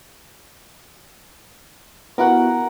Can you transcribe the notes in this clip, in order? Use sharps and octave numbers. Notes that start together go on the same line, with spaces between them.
B3 E4 F#4 A#4 F#5